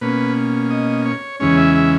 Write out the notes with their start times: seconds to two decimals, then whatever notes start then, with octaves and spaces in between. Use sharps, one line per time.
0.01 B2 A#3 C#4 B4
0.70 D#5
1.06 C#5
1.40 E2 C#3 E3 G#3 C#4 C#5
1.57 E5
1.75 E5